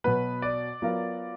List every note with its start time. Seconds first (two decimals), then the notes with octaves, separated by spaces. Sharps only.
0.04 B2 F#3 B3 B4
0.42 D5
0.82 F#3 B3 F4 A#4 F5